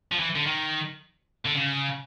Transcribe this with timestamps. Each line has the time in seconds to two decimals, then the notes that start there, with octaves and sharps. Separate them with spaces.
0.12 F3
0.20 E3
0.36 D3
0.47 D#3
1.45 D3
1.55 C#3